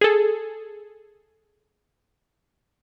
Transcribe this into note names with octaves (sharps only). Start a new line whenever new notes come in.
G#4 A4